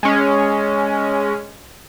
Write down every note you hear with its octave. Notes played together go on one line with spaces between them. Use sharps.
G#3 C#4